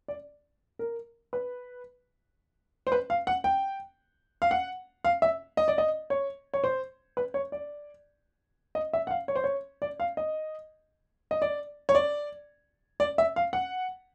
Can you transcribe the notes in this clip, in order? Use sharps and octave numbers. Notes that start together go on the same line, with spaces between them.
D5
A#4
B4
C5
B4
F5
F#5
G5
F5
F#5
F5
E5
D#5
D5
D#5
C#5
C#5
C5
B4
C#5
D5
D#5
E5
F#5
F5
C#5
C5
C#5
D5
F5
D#5
D#5
D5
C#5
D5
D5
E5
F5
F#5